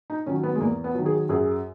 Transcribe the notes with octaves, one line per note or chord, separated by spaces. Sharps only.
D#4
D#3 F#3 C#4
B3
G#3
E2 A#3
B3
D#3 F#3
G#4
F#2 G#4